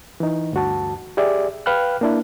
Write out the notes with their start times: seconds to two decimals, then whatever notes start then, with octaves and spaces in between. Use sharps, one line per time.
0.20 E3 D#4
0.53 D2 G2 F#4 A5
1.17 G4 G#4 D5 E5
1.66 B4 F5 G5 B5 F6 F#6
2.01 A#3 D4 E4